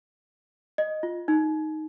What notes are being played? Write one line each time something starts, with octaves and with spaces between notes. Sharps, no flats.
D#5
F4
D#4